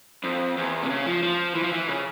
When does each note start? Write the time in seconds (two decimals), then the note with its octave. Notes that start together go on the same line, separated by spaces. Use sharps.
0.24 F2
0.57 E2
0.82 C3
0.90 C#3
1.06 F3
1.23 F3
1.55 E3
1.64 F3
1.73 E3
1.88 C#3